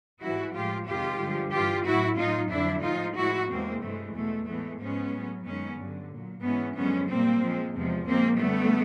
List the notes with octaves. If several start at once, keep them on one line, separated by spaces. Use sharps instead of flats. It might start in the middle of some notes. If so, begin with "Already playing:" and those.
G#2 E3 G3 E4 F#4
A2 F3 G#3 F4 G4
F2 C3 D#3 G#3 F4 G4
G2 D3 F3 G#3
G2 E3 G3 F4 G4
A2 F#3 E4 F#4
A2 F#3 D#4 F4
F2 D3 F#3 D4 E4
A2 F3 G#3 D#4 F4
A2 F3 G#3 E4 F#4
E2 C3 E3 G#3 A#3 C4
G2 E3 G#3 A3
E2 B2 G#3 A3
A2 E3 G#3 A3 B3
G#2 F3 G#3 B3 C#4
A2 F#3
F#2 D#3 G#3 B3 C#4
G2 D3 F#3
A#2 F#3
G#2 E3 G#3 B3 C#4
F#2 D3 F3 G#3 B3 C#4
A#2 G3 A#3 C4
A#2 F3 G#3
E2 C3 F3 G#3
A#2 F3 G#3 A#3 C4
F#2 D3 G3 A3 B3